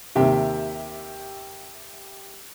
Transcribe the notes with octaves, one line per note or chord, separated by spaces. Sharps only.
D#2 C3 G4 E5 G5